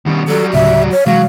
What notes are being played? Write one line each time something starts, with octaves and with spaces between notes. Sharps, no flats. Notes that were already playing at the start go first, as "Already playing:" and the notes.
B2 D#3 G3 C#4
F#3 G3 A4
D2 A2 C#3 E5
C#5
C3 E3 F#3 G#3 F5